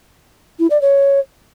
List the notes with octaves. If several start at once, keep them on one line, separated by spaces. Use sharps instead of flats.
E4
D5
C#5